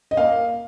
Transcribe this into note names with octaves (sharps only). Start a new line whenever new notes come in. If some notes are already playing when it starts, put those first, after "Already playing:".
D#5
A#3 F5